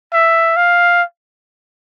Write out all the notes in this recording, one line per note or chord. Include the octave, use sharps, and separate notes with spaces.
E5
F5